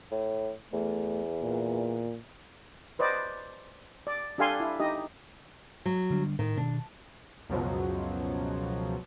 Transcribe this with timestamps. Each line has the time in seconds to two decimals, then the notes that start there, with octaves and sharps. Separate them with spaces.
0.11 A2
0.73 E2 A3
1.43 A#2
2.99 B4 C5 D5 D#5
4.07 D5
4.38 D4 G4 A4 F5 G#5 C6
4.60 E4
4.80 D#4 G4 D#5
5.86 F#3
6.10 D3 G3 D4
6.39 A2 D#3
6.57 B2 D#3 D4
7.49 C#2 F#2 B2 F3 F#3